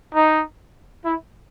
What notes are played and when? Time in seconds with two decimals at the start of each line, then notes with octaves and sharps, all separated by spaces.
0.15 D#4
1.05 E4